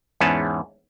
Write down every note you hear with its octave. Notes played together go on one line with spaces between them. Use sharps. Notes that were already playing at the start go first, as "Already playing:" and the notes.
E2 G#2 C#4 B4 A5